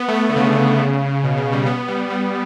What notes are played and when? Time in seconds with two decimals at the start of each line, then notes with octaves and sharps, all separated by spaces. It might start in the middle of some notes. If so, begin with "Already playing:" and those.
Already playing: B3
0.08 A3
0.14 B3
0.29 D3
0.36 C#3
1.24 B2
1.37 B2
1.52 G3
1.66 B3
1.88 G3
2.10 G3